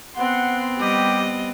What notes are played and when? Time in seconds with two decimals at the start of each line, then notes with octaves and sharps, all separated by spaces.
0.16 B3 C4 F#5 C6
0.79 G3 G4 D#5